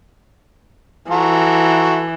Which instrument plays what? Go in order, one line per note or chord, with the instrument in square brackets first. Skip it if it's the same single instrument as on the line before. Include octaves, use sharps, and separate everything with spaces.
[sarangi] E3 [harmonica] F#4 A4 A#5